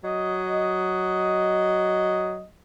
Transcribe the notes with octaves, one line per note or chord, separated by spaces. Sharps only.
F#3 D#5